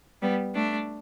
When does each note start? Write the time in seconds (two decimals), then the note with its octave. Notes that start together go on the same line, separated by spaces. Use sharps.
0.21 G3 B3
0.55 A3 D4